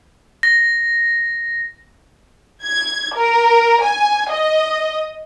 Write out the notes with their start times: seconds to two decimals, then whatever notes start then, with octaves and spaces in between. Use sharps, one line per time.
0.43 A#6
2.64 G#6
3.16 A#4
3.84 G#5
4.32 D#5